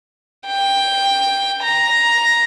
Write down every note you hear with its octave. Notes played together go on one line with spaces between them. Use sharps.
G5
A#5